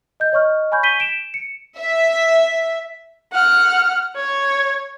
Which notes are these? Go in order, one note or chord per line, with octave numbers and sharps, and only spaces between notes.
D#5 G6
C#5 D#5 C#6 F6
G#5 B5 C#6 G6
G6 B6 D#7 G7
D7 E7
C#7
E5
F#5 F6
C#5